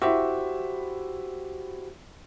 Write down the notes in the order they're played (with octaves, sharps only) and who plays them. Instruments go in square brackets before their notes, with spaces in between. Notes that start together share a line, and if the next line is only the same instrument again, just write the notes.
[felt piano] E4 E5 [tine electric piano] F#4 G4 C5